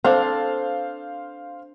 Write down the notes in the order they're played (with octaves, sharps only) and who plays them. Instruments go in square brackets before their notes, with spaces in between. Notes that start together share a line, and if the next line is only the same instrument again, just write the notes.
[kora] C4 D4 A4 [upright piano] C5 F5